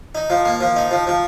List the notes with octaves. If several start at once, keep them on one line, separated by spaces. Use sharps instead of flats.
D#4
F3
A#3
F3
D#4
F3
F3